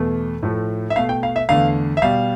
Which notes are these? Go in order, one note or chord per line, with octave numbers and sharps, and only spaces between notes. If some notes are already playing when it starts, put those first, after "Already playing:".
Already playing: E2 B2 A3
A2 F3 A3
E5
B2 A3 F5
G5
F5
E5
E2 D3 A3 F5
E5
B2 G3 F5